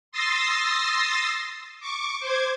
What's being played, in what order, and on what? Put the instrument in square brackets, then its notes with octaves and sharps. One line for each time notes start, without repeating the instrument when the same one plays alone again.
[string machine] C6 D#6 E6 A6 A#6 C7
C#6 D6
C5 D6 G#6